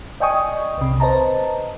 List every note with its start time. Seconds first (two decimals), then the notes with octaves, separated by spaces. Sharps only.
0.20 D5 D#5 G5 G#5 C#6 D#6
0.78 C2 C3
1.00 B4 C5 D#5 A5 A#5